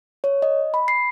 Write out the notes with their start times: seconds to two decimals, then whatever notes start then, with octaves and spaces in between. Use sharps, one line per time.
0.24 C#5
0.42 D#5
0.74 B5
0.88 C7